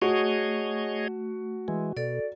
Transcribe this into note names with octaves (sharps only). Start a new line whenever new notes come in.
A3 F#4 G#4 C#5 D#5
E3 G#3
B2 A4 D5